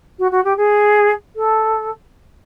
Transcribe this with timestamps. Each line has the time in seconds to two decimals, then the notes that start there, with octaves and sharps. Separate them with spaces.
0.19 F#4
0.31 F#4
0.44 G4
0.57 G#4
1.36 A4